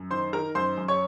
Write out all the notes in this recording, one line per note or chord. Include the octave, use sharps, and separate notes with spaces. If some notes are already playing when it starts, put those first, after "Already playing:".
Already playing: F#2
D#3 C5 C6
D#3 A#4 A#5
F#2 C5 C6
F#2
C#5 C#6